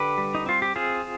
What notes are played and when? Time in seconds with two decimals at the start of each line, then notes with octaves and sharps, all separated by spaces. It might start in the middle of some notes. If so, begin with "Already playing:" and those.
Already playing: D3 G4 B4
0.18 G3
0.35 D#4
0.46 C4 F4
0.62 G4
0.76 C4 F4 G#4